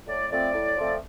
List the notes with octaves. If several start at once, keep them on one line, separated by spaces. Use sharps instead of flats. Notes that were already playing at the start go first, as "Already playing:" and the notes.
A2 D5
F3 A3 C4 D5
A2
F3 A3 C4